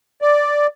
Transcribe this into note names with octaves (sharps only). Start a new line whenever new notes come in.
D5